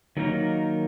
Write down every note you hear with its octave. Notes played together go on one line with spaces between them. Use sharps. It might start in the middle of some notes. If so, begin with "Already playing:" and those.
D#3 F#3 A#3 D#4 A#4